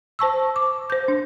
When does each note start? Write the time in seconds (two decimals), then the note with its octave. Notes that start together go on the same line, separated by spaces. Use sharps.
0.19 C5 A5 C#6 E6
0.56 D6
0.90 C5 G6
1.08 D4